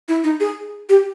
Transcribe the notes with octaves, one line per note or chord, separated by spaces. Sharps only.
E4
D#4
G#4
G4